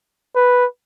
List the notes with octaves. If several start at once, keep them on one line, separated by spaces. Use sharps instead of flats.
B4